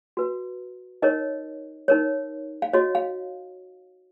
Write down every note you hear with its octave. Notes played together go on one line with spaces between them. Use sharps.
F#4 B4
D#4 A#4 C#5 D#5
D#4 A#4 C#5
F5
F#4 C#5 D#5
F5